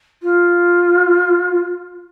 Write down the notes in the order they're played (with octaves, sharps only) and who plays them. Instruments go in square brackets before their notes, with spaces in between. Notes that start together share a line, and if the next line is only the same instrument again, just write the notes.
[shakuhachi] F4